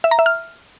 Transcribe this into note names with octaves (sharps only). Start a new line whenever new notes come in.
E5
A#5
E5
F6